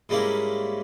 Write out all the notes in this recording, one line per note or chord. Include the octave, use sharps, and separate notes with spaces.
G#2 G3 G#3 A#3 C#4 E4